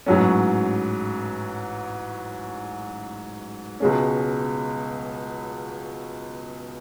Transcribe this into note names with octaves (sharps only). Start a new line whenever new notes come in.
A1 G#2 F#3 C#4
C#2 B2 G#3 C#4